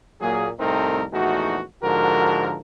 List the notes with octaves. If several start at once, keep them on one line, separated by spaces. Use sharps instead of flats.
A#2 F#3 A#3 G#4
C2 A2 A3 C4 D#4 A#4
A#1 E2 A3 D#4 F#4
G#2 D3 F3 F#4 A#4